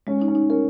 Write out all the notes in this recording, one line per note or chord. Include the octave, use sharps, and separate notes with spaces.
G#3 C#4
D#4
C#4
D#4
C#4 A#4